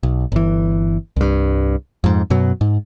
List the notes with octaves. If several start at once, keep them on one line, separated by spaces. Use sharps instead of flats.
B1
G1 E3
C2 G2
F2 G#2
F#2 B2 F#3
G#2